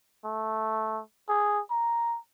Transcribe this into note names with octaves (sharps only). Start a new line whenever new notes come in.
A3
G#4
A#5